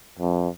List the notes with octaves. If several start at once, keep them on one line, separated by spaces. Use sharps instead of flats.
F2